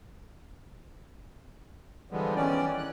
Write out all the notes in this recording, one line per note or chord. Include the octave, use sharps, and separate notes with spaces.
D3 E3 F3 G3 G#3 B3
D#3 E3 C#4 D5
F#6